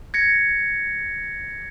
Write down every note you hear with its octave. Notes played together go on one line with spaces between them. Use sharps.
G#6 A#6 C#7